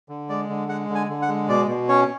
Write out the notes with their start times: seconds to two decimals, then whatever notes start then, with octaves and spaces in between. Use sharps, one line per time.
0.09 D3
0.29 G#3 D5
0.49 D3
0.68 G#3 F#5
0.89 D3
0.95 G#5
1.09 D3
1.22 F#5
1.29 G#3
1.49 B2 D5
1.68 B2
1.89 C#4 C#5